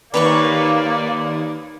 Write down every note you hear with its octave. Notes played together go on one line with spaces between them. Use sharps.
D#2 A#3 B4 D5 A#5 C#6